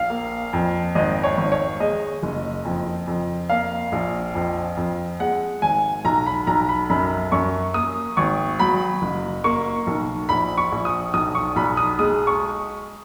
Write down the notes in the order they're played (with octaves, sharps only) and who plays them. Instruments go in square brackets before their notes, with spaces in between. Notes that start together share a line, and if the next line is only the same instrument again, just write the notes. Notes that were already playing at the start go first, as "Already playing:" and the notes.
Already playing: [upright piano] A#1 F5
A#3
F2
G#1 D#5
C#5
G#1
C#5
G#3 D#5
F#1
F2
F2
A#3 F5
A#1
F2
F2
G#3 F#5
G#1 G#5
B1 A#5
B5
B1 A#5
B5
F#2 B5
F#2 C#6
A#3 D#6
G#1 C#6
F#3 B5
F#1
A#3 C#6
B1
A#1 B5
C#6
A#1
D#6
B1 D#6
C#6
B1 B5
D#6
G#3 D#6
C#6